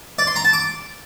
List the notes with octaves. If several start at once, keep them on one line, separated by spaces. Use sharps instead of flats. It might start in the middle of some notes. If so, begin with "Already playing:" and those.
D5
C6
A#5
A5
D6